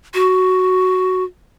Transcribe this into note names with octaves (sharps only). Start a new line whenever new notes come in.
F#4